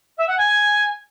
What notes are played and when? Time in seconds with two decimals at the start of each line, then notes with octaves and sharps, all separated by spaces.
0.17 E5
0.27 F#5
0.37 G#5